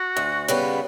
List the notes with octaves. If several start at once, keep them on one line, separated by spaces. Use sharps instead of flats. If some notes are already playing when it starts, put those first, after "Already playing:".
Already playing: F#4
D2
C#3 G3 B3